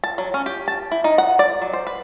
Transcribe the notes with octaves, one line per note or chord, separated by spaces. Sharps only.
A5
F#3
C#4
G4
A5
E4
D#4
F#5
D5
F#3
C5
B4